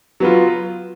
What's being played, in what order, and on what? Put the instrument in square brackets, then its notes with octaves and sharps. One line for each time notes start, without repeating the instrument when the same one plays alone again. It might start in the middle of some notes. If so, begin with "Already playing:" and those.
[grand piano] F#3 B3 F4